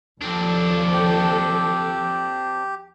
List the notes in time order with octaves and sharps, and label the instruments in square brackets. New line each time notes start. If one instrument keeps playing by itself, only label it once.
[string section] D#2 F3 A4 [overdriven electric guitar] C4 D4
[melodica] G4